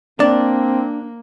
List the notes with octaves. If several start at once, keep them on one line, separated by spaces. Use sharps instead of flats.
A#3 C4 D4 D5